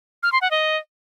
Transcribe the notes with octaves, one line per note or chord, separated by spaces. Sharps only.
F6
C6
F#5
D#5